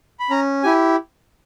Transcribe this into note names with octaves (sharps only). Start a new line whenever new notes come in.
B5
C#4 A#5
E4 G4 G#5